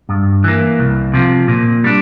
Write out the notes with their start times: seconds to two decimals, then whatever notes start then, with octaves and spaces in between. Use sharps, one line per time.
0.09 G2
0.44 E3 A#3
0.79 C2
1.14 C3 F3
1.48 A#2
1.84 G3 D4